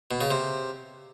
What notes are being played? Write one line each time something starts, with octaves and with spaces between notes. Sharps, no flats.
B2
C#3
C3